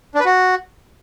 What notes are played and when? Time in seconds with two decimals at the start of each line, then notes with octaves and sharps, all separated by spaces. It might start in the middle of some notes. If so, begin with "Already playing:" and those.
0.15 D4
0.20 B4
0.25 F#4